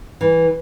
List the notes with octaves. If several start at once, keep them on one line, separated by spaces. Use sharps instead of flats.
E3